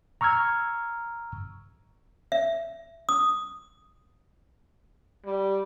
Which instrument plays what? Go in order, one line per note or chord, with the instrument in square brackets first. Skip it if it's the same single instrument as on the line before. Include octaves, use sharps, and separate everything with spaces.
[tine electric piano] A#5 C#6 E6 F6 G#6
[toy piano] E5
D#6
[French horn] G3